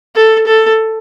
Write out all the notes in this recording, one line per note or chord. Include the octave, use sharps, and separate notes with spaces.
A4
A4